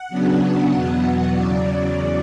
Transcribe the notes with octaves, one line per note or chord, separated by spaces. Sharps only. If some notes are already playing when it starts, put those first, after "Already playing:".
Already playing: F#5
C#3 F#3 B3 D4
F#5
E2 B2 F#3 B3
E2 C#3 F#3 D5
D5